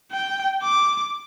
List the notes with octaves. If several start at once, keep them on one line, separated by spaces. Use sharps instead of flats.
G5
D6